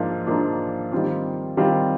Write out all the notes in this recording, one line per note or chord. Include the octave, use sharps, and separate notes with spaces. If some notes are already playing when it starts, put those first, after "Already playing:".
Already playing: G#2 F3 A#3 D4 F4
G#2 F3 A#3 D4 F4
D#3 G3 C4 F4
D#3 G3 C4 F4